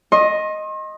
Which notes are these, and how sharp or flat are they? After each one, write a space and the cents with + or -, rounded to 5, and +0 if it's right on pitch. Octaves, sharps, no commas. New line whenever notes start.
D#5 +0 C6 +40